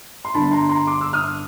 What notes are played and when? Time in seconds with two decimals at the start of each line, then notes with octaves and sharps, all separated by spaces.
0.25 C6
0.34 G1 G2 D3 A5 B5
0.51 A#5 C6
0.69 A#5 C6
0.87 C6 D6
1.01 D6 E6
1.13 D#6 F6